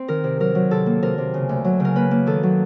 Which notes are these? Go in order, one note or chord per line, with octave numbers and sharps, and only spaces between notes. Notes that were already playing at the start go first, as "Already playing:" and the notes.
Already playing: C4
D#3 A#4
C3
F#3 A#4
F#3
C3 A4
A#3
C3 A#4
C3
C#3
D2
F#3
C#3 A#4
A#3 B4
A#3
D#3 A4
F#3